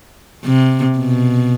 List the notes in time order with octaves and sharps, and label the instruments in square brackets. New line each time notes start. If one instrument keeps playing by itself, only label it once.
[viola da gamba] C3
B2